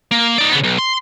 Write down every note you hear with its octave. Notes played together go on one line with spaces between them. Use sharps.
A#3
D#4 D5
C#3 B3
B1
C6